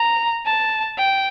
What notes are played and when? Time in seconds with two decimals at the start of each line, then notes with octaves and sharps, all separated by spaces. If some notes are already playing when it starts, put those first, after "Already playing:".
Already playing: A#5
0.46 A5
0.98 G5